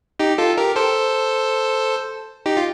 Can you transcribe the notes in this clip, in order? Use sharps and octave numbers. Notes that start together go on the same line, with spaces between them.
D#4 G4
F4 A4
G4 A#4
A4 C5
D#4 G4
F4